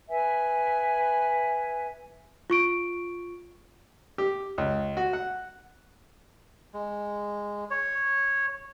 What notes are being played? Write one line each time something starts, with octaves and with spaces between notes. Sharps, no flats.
B4 E5 G#5
F4 C#6 D7
G4
C#2
F#4
F#5
G#3
C#5